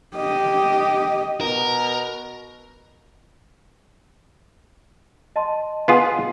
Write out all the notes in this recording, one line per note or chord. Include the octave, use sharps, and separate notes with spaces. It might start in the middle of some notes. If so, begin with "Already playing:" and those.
G4 D#5
B2 A#4
D#5 A5 C6
B3 F4 G#4